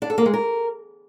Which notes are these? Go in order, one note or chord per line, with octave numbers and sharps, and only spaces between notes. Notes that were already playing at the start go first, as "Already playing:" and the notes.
D4
A4
A#3
G#3
A#4